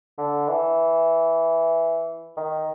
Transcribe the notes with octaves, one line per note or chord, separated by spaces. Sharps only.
D3
E3
D#3